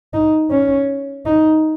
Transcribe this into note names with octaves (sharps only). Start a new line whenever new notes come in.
D#4
C#4
D#4